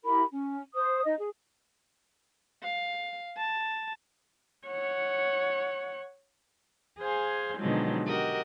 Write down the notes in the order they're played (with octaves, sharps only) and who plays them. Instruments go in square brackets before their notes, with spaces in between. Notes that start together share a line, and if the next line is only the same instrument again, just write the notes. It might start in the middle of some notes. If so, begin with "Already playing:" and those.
[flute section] E4 G4 A#4 B5
C#4
C5 D#6
D#4 D#5
G#4
[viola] F5
A5
[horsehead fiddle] C#5 F#5
[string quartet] G#4 C5 F5 G#5
B2 D3 D#3 F3 F#3 G#3
F#4 G4 A#4 D#5